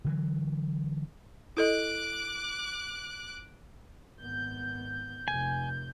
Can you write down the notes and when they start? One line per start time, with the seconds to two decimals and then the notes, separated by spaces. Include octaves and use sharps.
0.04 D3 E3 F#3
1.57 E4 A4 D#5 D6 F#6
4.18 G#1 B3 G6
5.28 F1 G#5